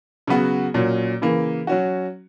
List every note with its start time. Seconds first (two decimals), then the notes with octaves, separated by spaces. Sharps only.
0.27 C#3 F#3 B3 F#4
0.74 A#2 F#3 C#4
1.22 C#3 E3 A#3
1.67 F#3 C#4 F#4